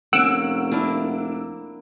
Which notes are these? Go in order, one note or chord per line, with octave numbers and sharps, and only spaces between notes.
F1 A#3 C#4 F#5 E6 D7
A#3 D4 E4